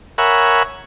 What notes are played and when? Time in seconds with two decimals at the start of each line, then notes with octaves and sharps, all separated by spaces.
0.18 A#4 C#5 E5 F#5 G#5 B5